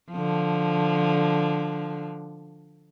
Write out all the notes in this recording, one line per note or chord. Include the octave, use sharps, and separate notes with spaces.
D3 F3